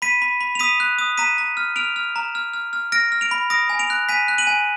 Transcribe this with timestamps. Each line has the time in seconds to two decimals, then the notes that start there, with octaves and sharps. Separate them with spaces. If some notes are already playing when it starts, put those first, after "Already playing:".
0.02 B5 B6 D#7
0.22 B5
0.41 B5
0.55 F7
0.59 D#6 B6 D#7
0.80 F#6
0.99 D#6
1.18 A#5 B6 D#7
1.38 A#5
1.57 F6
1.76 F6 D7 F7
1.96 F6
2.16 A#5
2.35 F6
2.54 F6
2.73 F6
2.92 F6 A#6 D7
3.12 F6
3.21 D7 F7
3.31 B5
3.50 D#6 A#6 D7
3.70 G#5
3.79 D7 F7
3.90 F#6
4.09 G#5 B6 D#7
4.28 F#6
4.38 D#7 F#7
4.47 G#5